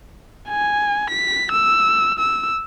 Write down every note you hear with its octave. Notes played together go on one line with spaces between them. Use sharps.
G#5
B6
E6
E6